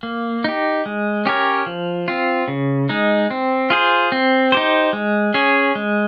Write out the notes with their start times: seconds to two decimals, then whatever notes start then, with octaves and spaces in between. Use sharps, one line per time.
0.03 A#3
0.44 D#4 G4
0.86 G#3
1.26 C#4 G4 A#4 C#5
1.66 F3
2.08 C4 F4
2.48 C#3
2.89 G#3 D#4
3.31 C4
3.70 F4 G#4 C5
4.12 C4
4.52 D#4 G4 C5
4.93 G#3
5.34 C#4 G#4 C#5
5.75 G#3